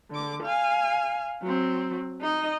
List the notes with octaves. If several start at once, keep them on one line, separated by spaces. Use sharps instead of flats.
D3 D6
F5 G#5
F#3 C4
D#4 D#5